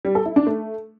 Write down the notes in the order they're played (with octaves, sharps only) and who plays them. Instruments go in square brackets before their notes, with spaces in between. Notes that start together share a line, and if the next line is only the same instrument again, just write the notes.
[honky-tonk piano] G3
A4
E4
D4
A3